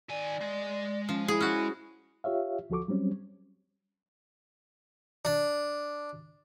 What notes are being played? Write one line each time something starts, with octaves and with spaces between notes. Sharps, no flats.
D#3 D5 G#5
G#3
F3 C#4
E4 G#4
C#4 F#4
F4 G4 C#5 E5 F5
D2 F3 F#4 A4 C#6 D6
F#3 G3 C4 C#4
D4